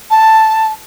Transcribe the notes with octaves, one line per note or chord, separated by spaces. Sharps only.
A5